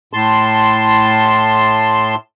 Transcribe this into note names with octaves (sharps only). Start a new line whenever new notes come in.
A2 A5 C6